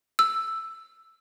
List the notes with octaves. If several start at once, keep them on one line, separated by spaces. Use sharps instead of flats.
E6